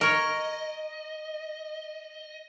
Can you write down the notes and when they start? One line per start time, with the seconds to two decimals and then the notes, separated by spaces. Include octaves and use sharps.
0.01 A#4 C#5 D#5